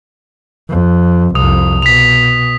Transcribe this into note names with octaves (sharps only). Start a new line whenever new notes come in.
F2
C2 F2 D#6
B2 B6 F7